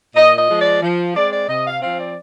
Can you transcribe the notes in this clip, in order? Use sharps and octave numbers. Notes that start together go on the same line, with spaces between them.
A#2 D#5
D#5
F3 G#3
D5
F3
G#3 C4 D5
D5
C3 D#5
F5
F3 C4 F5
D5